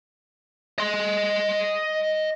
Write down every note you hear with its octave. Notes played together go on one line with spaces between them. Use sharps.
D#5 C6